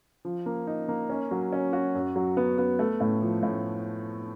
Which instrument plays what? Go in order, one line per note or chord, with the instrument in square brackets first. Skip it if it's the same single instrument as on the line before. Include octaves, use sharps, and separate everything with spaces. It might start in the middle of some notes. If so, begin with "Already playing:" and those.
[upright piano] F3
A#3
D#4
A#3
C#4
F#3
C#4
F#4
F#2
F#3
B3
B3
A3
A2
F3
A2